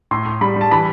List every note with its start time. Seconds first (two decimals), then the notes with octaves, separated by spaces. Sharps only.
0.11 A2 C6
0.26 A2
0.41 G3 B5
0.56 G3 A5
0.71 E3 B5